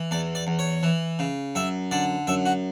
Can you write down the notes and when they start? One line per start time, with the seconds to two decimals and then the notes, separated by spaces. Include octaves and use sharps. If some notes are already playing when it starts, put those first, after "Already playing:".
Already playing: E3
0.11 E2 D5
0.35 D5
0.47 E2
0.59 C#5
0.83 E3
1.19 C#3
1.55 F#2 E5
1.91 D3 D5
2.27 F#2 E5
2.46 F#4